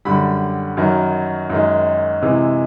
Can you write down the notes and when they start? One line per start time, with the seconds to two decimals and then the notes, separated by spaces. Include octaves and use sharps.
0.05 F#2 D3 G3 B5
0.77 F#2 D#3 F#3
1.50 F#2 D#3 G#3
2.22 C3 E3 G#3